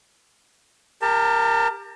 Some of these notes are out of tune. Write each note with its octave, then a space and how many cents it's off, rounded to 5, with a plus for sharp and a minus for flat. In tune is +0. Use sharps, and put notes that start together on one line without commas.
G4 +25 A#4 +0 A5 +35